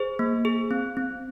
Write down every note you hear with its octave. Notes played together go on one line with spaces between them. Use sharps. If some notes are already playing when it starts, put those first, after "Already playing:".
Already playing: G#4 C5
A#3
G#4
C4
C4